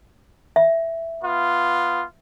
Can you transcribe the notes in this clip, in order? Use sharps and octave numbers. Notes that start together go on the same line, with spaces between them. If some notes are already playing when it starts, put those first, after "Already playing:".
E5
B3 F4